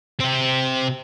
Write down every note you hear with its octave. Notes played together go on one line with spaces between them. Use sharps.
C3 C4